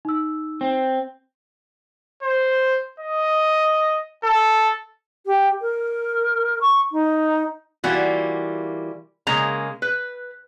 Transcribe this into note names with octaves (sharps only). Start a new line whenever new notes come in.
D#4 E6
C4
C5
D#5
A4
G4
A#4
C#6
D#4
E3 G3 A#3 F4 F#4
C#3 G#3 A#3 A#5
B4